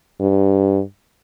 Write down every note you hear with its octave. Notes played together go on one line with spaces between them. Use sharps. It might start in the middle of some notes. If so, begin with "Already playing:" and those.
G2